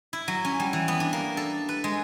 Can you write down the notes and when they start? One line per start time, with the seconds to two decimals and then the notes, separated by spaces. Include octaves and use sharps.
0.13 E4
0.28 F#3
0.45 C#4
0.60 G3
0.73 E3
0.88 B3
1.00 D4
1.13 A#3
1.37 A4
1.69 B4
1.84 G#3